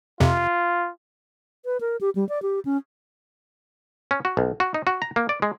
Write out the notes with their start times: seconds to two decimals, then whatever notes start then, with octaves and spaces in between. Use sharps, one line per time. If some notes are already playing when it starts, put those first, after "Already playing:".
0.20 F2 C3 F4
1.65 B4
1.81 A#4
2.01 G4
2.15 G3
2.29 D5
2.42 G4
2.65 C#4
4.11 C#4
4.25 F#4
4.37 B1
4.60 F#4
4.74 D#4
4.87 F#4
5.02 A#5
5.16 A#3
5.29 D5
5.42 G#3